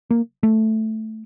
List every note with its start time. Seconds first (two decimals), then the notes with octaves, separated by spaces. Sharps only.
0.11 A#3
0.43 A3